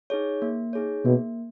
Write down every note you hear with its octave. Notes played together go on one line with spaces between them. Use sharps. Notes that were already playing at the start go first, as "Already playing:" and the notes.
D#4 G#4 C#5
A#3
D#4 G#4 C#5
B2 A#3